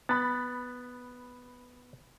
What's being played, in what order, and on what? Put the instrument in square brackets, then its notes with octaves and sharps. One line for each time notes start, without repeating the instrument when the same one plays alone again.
[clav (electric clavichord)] B3 [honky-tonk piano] B5 A6